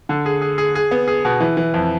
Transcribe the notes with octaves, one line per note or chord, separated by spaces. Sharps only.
D3
G#4
G#4
G#4
G#4
B3
G#4
B2
E3
E3
F2